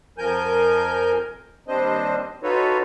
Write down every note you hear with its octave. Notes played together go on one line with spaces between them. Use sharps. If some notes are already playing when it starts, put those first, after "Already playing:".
F2 F3 A#4 G#5 G6
D#2 G3 C4 D4 C5 D#5
D#4 F4 F#4 A4 B4 C#5